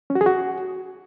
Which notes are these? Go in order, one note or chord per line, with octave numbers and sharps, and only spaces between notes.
C#4
F#4
G#4
F#4